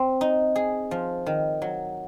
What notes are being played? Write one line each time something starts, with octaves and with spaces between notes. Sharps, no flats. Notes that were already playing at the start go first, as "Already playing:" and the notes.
Already playing: C4
D#4
G#4
F3
D#3
F#3